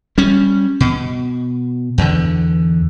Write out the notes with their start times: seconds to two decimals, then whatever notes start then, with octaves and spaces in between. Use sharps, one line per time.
0.18 G3 C#4
0.80 B2
1.98 E2 D3